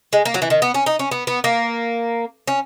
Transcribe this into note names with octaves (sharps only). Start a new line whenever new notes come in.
G#3
A#3
F#3
E3
D#3
B3
C#4
D#4
C#4
B3
B3
A#3
C#4